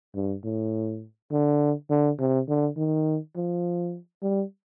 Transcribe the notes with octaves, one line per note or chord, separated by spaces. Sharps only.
G2
A2
D3
D3
C3
D3
D#3
F3
G3